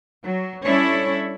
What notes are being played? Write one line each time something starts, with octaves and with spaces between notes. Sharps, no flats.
F#3
G3 C#4 D4 E4 A4 C#5